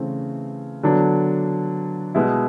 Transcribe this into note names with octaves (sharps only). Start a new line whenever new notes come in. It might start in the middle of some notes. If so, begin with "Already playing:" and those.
Already playing: C#3 E3 A3 C4
D3 F#3 B3 D4
B2 G#3 B3 E4